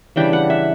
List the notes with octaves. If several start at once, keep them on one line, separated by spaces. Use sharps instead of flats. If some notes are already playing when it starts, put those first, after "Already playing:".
C#3 E3 G3 D4 G5
F#5
E5